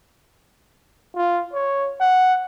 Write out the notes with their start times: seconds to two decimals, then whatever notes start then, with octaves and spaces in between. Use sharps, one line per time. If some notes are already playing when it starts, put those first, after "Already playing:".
1.16 F4
1.53 C#5
2.00 F#5